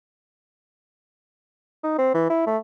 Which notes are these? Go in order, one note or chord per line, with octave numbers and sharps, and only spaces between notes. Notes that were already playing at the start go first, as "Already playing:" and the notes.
D#4
C4
E3
E4
A3